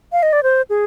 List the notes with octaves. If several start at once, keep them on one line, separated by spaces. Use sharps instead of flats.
F5
D#5
D5
C5
G#4